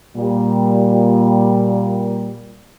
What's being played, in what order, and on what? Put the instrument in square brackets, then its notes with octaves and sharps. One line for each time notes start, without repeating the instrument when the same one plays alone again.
[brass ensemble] A#2 G3